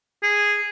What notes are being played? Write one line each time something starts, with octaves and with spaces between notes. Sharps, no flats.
G#4